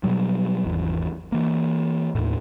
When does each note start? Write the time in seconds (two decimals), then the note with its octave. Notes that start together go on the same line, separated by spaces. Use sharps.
0.03 B2 F#3 G3
0.64 G#1 E2
1.32 E3 A#3
2.15 D#2 A2